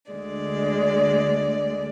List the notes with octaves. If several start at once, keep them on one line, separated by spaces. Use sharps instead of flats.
D2 D3 G#3 D5